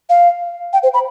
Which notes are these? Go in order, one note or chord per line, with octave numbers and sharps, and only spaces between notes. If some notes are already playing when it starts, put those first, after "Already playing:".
F5
G5
C5
B5